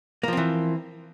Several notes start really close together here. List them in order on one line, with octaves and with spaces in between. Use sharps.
A#3 F3 C4 E3